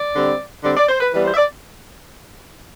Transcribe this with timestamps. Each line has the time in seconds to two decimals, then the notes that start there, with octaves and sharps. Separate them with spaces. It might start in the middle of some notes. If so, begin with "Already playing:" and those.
Already playing: D5
0.16 D3 G3 C4
0.63 D3 G3 C4 D5
0.77 D5
0.89 C5
1.01 B4
1.12 E3 G3 B3 B4
1.25 C5
1.33 E5
1.37 D5